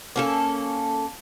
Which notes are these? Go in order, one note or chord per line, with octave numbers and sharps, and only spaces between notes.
A#3 C#4 A4